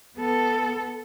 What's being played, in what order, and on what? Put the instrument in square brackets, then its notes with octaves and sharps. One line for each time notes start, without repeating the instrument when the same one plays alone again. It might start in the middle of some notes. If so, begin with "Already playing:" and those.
[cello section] B3 A4